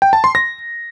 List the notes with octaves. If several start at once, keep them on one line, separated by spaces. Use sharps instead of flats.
G5
A5
C6
A#6